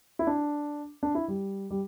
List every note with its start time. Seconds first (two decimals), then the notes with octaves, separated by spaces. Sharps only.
0.19 E4
0.27 D4
1.03 D4
1.15 E4
1.28 G3
1.70 G3